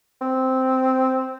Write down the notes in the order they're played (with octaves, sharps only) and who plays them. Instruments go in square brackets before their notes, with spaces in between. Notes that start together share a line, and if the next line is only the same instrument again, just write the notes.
[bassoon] C4